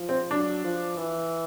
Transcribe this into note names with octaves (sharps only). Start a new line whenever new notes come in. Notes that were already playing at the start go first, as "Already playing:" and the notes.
Already playing: F3
C4
F#3 D4
F3
E3